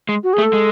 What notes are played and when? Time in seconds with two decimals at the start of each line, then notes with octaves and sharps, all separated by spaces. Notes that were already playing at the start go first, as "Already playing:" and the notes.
0.09 G#3
0.24 F#4
0.33 G#4
0.38 A3
0.43 A4
0.53 G#3